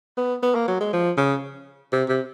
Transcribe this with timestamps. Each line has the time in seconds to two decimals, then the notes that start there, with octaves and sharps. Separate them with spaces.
0.18 B3
0.43 B3
0.55 A#3
0.68 F#3
0.81 G#3
0.93 F3
1.18 C#3
1.92 C3
2.09 C3